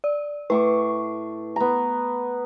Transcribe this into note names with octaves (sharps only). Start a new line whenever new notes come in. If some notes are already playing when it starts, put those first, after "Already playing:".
D5
A2 B4 C#6 D6
B3 A#5